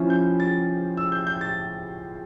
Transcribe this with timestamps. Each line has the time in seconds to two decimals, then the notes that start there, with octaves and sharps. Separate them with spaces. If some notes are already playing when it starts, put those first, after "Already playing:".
Already playing: F3 C#4 E4
0.10 G6
0.40 A6
0.97 E6
1.12 G6
1.27 G6
1.41 A6